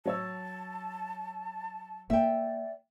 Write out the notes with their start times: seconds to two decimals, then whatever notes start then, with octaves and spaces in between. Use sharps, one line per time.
0.05 F#3 C#5 A5 E6
2.10 A#3 D5 E5 G5